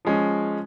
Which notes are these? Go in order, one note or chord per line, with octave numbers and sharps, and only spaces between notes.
F3 G#3 C#4